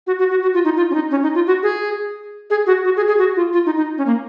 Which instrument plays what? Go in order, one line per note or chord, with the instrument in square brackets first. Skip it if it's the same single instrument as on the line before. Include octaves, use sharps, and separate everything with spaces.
[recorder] F#4
F#4
F#4
F#4
F4
D#4
F4
C#4
D#4
C#4
D#4
F4
F#4
G#4
G#4
F#4
F#4
G#4
G#4
F#4
F4
F4
D#4
D#4
C#4
A#3